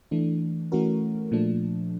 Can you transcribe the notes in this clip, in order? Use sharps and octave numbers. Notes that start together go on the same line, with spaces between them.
E3 A3 D4
E3 A3 C#4 F#4 A#4
A#2 F3 A3 D4